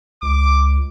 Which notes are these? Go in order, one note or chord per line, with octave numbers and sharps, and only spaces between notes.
C#2 D6